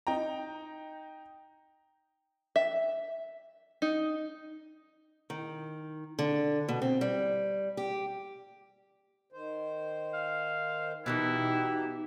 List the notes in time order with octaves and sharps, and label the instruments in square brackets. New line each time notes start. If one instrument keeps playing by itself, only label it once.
[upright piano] D#4 G5 A#5
[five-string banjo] E5
D#4
[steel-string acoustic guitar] D#3
D3
B2
C4
G3
G4
[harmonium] D#3 C5
[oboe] F5
[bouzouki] B2 D#3 E3 [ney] D#4 [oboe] E4 [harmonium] G4